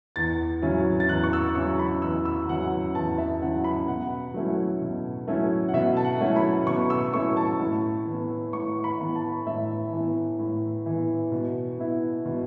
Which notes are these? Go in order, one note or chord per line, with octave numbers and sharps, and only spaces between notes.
E2 A6
C#3 F#3 C#4 E4
A6
E2 F#6
C#6
E6
C#3 F#3 C#4 E4 C#6
B5
E2 E6
E6
C#3 F#3 C#4 E4 F#5
E2 A5
E5
C#3 F#3 C#4 E4 F#5
B5
B2 F#5
F#3 A3 C#4 E4
B2
F#3 A3 C#4 E4
F#5
B2 E5
A5
F#5
F#3 A3 C#4 E4
B5
B2 C#6
E6
F#3 A3 C#4 E4 C#6
A5
A2
E3
B3
A2 C#6
B5
E3 B3
A5
A2 E5
E3 B3
A2
E3 B3
B2
B3 E4
B2